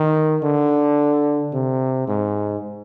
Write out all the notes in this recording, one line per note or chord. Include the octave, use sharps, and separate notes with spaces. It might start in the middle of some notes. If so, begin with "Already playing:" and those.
Already playing: D#3
D3
C3
G#2